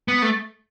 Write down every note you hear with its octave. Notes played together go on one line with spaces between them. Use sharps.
B3
A3